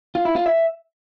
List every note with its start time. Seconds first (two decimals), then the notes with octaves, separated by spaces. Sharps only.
0.15 F4
0.25 E4
0.36 F4
0.46 E5